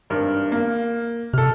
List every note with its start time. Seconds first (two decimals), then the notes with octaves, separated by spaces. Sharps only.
0.10 G#1 G2 A#4
0.52 A#3
1.33 C3 A4 F6